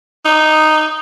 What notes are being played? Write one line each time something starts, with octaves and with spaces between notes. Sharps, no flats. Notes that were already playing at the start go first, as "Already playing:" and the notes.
D#4